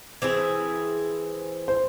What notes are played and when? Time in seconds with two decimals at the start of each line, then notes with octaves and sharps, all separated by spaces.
0.22 E3 C4 E4 G#4 C5
1.68 C5